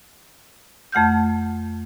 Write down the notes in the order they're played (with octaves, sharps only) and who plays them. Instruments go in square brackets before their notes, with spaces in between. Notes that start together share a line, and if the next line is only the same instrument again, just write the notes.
[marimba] F2 A3 F#5 F6 G6